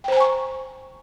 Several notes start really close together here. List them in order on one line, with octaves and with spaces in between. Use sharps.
G5 C5 A#5 G#5 C#6